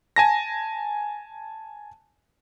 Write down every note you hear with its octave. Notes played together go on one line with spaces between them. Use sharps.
G#5 A5 A#6